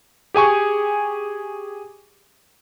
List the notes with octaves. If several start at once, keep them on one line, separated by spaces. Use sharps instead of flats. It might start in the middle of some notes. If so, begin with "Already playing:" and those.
G4 G#4 G#5 C#6